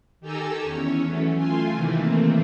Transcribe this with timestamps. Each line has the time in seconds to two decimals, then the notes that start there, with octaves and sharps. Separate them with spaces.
0.21 D#3 G4 A4 G#5 A#5 E6
0.62 E2 C#4 C#5
1.03 E3 F#3 A3 C#4
1.36 A3 F4 G#5 C6
1.73 C3 D#3 E3 A3 A#3 C4